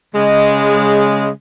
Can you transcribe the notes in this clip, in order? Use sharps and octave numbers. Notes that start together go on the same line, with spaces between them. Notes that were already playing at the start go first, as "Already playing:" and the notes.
C#3 G#3